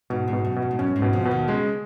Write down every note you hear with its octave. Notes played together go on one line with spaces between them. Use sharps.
G#2 B2
G#2
B2
F#2
B2
F#2
G#2
F#2 C#4
G#2
B2
F2 F3
B2
D#2 D#3
C#3 G#3